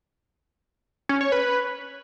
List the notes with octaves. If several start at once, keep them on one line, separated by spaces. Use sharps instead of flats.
C#4
C#5
B4